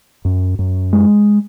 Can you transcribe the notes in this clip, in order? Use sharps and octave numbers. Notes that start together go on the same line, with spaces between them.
F#2
F#2
G#3